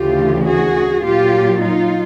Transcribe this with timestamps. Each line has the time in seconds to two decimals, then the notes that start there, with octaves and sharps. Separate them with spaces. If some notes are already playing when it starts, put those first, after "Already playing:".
Already playing: D2 C#3 E3 F4 G4
0.46 F#4 G#4
1.03 A#2 F#3 F4 G4
1.60 D#4 F4